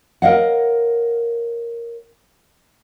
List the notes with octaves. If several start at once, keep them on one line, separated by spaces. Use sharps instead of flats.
A#4 C5 C#5 D#5 F5 F#5